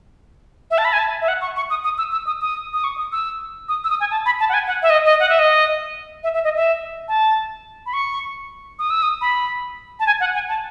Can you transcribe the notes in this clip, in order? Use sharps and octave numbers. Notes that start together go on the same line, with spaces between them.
E5
A5
B5
G#5
A5
E5
F#5
C#6
C#6
D#6
D#6
E6
E6
D#6
D#6
D#6
C#6
D#6
E6
D#6
E6
D#6
G#5
A5
B5
A5
F#5
G#5
F#5
E5
D#5
D#5
F#5
E5
D#5
E5
E5
D#5
E5
A5
B5
C#6
D#6
E6
D#6
B5
A5
G#5
F#5
G#5
A5